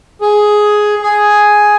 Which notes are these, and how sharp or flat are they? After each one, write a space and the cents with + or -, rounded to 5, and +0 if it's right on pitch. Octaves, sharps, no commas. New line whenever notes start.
G#4 +10
G#4 +5